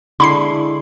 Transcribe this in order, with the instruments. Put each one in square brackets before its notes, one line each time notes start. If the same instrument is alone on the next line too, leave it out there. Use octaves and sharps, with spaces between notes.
[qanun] D3 G#3 E4 [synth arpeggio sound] B5 C6 C7